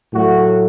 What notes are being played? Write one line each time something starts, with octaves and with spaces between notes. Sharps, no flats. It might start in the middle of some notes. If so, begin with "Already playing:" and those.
A2 F#3 A3 F#4